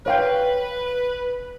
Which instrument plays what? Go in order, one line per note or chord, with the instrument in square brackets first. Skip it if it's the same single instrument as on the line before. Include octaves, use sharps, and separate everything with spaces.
[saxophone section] B4 [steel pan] C#5 F5 G5